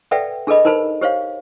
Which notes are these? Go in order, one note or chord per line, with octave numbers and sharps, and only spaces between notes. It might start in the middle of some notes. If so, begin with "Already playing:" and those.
A4 B4 D5 E5 F#5 G5
D4 G#4 A4 B4 D#5 B5
D#4 A#4 C5 A5 B5
G4 C5 C#5 F5